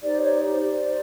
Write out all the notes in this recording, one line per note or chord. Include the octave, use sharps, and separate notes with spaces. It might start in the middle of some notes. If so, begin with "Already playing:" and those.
D#4 G4 C5 D5
C#5
D5
D#4 G4 C5